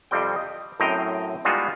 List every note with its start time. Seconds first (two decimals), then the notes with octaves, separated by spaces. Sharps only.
0.11 F2 C3 G3 C4 G5
0.36 D#5
0.80 F#2 A2 C4 D#5 G5 A#5
1.45 G3 G#3 B3 D#4 F4 F#4